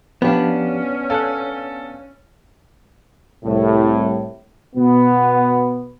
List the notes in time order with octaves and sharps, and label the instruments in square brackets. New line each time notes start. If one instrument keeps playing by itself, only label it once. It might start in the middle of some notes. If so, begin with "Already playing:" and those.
[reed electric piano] F3 G4 F5 [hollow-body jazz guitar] B3 D4 [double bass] C#4
[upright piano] A4 [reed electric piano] F5 G#5 F#6
[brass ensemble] C2 A2
B2 B3